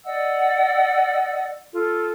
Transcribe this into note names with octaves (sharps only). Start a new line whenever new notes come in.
D5 D#5 F#5 E6
F4 A4